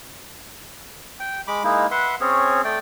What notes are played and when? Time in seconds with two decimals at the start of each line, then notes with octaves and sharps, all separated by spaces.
1.20 G5
1.48 G#3 B5 D6
1.64 G#3 A#3 D#4 E4
1.91 B4 E5 F#5 C6
2.21 C4 C#4 G#4 C#5
2.64 A3 D5 G5